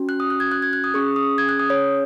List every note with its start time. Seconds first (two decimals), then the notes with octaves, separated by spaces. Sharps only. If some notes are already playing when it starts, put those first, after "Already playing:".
Already playing: C#4 F#4
0.09 F#6
0.20 D#6
0.30 F#6
0.40 G#6
0.52 F#6
0.62 G#6
0.73 F#6
0.84 D#6
0.94 C#4 G#4 C#6
1.16 D#6
1.38 G#6
1.49 F#6
1.59 D#6
1.70 C#5